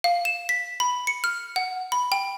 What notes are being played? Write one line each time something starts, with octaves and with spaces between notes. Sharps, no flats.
F5
E7
B6
B5
C#7
F6
F#5
B5
G5